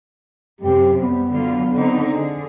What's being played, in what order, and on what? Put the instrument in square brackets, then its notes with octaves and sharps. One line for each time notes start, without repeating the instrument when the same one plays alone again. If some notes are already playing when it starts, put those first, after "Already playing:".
[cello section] F#2 C3 C4 [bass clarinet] G4
[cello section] G3 [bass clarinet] B3
[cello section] D3 F#3 F4
D3 C4 D#4
D3 G#4